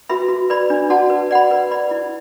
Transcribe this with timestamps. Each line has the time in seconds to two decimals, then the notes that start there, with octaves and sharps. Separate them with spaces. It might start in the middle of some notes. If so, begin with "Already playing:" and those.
0.09 F#4 B4 E5 B5
0.29 F#4
0.50 B4 D5 B5
0.70 D4
0.90 F#4 D5 F#5 A5
1.10 B4
1.31 D5 F#5 B5
1.51 B4
1.71 D5 B5
1.91 E4